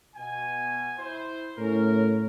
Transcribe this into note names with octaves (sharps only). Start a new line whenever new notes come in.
B2 G#5
E4 C5
A2 C#4 A#4